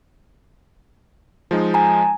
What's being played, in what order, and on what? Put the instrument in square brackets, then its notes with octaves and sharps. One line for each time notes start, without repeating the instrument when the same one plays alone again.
[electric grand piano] F3 G#3 D#4
[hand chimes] G#5 A#5